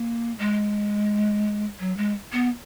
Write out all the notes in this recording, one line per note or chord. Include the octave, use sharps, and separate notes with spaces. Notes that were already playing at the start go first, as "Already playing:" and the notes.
Already playing: A#3
G#3
F#3
G#3
B3